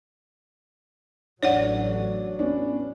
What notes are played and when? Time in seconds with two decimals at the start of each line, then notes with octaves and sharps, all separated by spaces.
1.43 A1 F#3 D4 C#5 D5 F#5
2.39 B3 C#4 D4